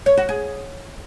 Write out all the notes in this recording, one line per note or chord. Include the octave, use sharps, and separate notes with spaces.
C#5
F#4
G#4